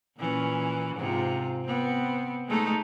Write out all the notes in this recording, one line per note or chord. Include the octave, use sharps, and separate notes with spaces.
A#2 E3 C#4
G#2 C3 F4
B3 C4
G#3 A3 D#4